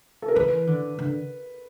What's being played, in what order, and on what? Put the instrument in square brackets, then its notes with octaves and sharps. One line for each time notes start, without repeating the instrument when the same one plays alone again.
[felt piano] A4
A#4
[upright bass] E3 [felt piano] B4
[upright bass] D3
D3